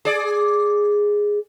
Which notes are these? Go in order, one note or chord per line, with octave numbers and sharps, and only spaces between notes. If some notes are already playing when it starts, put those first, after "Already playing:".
G#4 D5